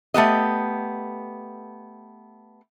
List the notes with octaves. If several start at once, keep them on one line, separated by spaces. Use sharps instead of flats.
A3 B3 G4 D#5